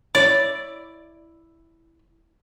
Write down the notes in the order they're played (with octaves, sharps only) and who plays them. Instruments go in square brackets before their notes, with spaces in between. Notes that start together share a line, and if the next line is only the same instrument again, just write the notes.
[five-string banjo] E4 C#5 [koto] D5